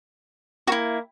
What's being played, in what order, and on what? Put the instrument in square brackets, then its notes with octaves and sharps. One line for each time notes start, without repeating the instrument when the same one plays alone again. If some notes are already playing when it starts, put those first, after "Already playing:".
[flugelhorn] A#3 [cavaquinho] E4 F#4